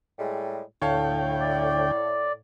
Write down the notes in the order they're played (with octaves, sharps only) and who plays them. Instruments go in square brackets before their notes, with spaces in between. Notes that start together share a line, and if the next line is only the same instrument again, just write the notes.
[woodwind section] A2 G3 G#3
[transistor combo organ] D2 G5 [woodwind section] A2 [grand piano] C#5 F5 A5
[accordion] D5